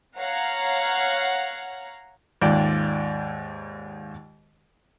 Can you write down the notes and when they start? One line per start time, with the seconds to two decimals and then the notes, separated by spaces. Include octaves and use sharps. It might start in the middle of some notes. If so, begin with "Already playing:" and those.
0.17 C#5 F5 F#5 A#5
2.42 D#2 G#2 F4 D5 G5